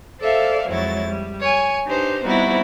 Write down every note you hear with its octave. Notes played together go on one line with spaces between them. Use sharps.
A4 C5 D5 E5 F5
F2 F#3 G#3 E4 C#5 A6
G3
C#5 G#5
D4 D#4 G4 B4 C5
G3 B3 C4 D#4 E4 F#4